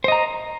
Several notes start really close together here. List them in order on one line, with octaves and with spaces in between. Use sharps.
C5 D#5 A#5